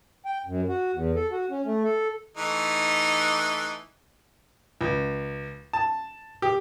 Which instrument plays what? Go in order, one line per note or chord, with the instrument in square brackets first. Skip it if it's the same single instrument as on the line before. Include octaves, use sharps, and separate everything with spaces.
[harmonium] G5
F#2
F#4
E2
A4
F#4
C#4
A3
A4
[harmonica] E3 A3 D#4
[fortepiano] C#2
A5
G4